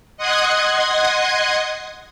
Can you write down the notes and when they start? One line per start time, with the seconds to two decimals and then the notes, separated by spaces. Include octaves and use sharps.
0.17 D#5 F#5 C6 D#6 F#6 G#6